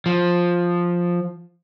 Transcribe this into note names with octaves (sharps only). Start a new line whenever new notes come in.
F3